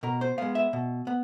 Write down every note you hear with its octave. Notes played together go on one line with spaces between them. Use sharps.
B2 A#4
C5
G#3 B3 F5
E5
B2
B3